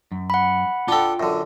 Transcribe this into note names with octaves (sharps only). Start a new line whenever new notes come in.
F#2
F#5 B5
D4 F4 A4 G5
F#2 D3